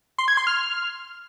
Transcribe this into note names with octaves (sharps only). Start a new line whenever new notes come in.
C6
G#6
C6
F6